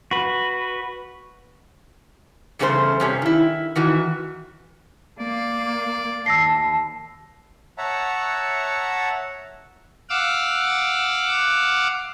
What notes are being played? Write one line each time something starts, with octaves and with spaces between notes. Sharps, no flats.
F#4 B4
E2 G2 C#3 A3 F4 C5
G2 C3 C#4
D#3 E4
D#3 E3 F#4
A#3 D5
D#2 A5 E6 A#6 C7
C#5 E5 F#5 A5 A#5
F5 F#5 D6 E6